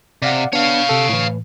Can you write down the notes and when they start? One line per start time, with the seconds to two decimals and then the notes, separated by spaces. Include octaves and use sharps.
0.22 C3 D5 F5 F#5
0.53 B3 D4 C#5 F5
0.89 C3 A4
1.09 A2 E3